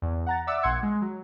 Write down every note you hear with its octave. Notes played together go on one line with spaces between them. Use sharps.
E2
F#5 A#5 A6
D5 E5 F#5 D6 E6
A#1 F#5 C6 G#6 C#7
G#3
F#3